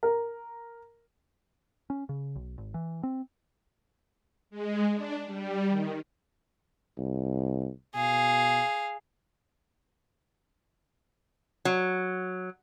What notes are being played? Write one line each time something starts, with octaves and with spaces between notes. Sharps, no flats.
A#4
C#4
C#3
B1
G#1
E3
C4
G#3
D4
G3
D#3
C2
B2 G#4 F5
F#3